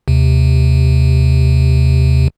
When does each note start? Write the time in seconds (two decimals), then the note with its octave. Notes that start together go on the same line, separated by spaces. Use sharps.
0.08 D#2 C3